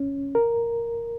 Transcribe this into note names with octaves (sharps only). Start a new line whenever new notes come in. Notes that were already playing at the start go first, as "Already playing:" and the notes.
Already playing: C#4
A#4